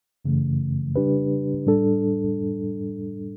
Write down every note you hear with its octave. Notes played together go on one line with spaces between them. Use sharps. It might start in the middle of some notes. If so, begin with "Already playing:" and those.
F#2 C#3 E3 A3
C#3 G3 D4 G4 B4
A2 G3 D4 A4